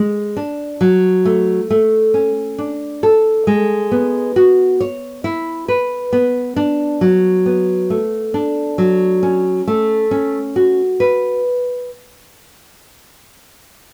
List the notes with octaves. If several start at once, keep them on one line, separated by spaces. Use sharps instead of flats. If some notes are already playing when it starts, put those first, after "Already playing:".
Already playing: G#3
D4
F#3
A3
A3
C#4
D4
A4
G#3
B3
F#4
C#5
E4
B4
B3
D4
F#3
B3
A3
D4
F#3
C#4
A3
C#4
F#4
B4